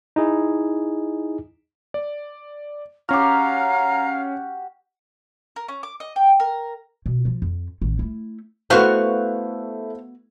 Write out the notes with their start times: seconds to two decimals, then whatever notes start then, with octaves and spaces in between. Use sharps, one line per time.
0.16 D#4 E4 G#4
1.94 D5
3.09 C#4 F#4 G4 F5 A#5 F6
5.56 A#4
5.68 C#4
5.83 D6
6.00 D#5
6.16 G5
6.40 A#4
7.06 B2
7.25 F3 F4
7.42 F2
7.82 A1 D#3
7.99 A3 E4
8.70 A3 B3 E4 F#4 C5 F5 C#6